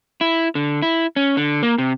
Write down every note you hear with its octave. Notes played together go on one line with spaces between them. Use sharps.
E4
D3
E4
C#4
D3
A#3
C3